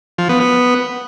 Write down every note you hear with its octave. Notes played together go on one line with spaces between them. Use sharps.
F3
B3
B3